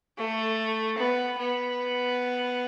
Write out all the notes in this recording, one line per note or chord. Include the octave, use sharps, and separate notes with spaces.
A3
B3
B3